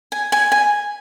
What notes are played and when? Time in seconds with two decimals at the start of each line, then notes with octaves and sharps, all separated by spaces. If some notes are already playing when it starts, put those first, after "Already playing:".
0.12 G#5
0.32 G#5
0.52 G#5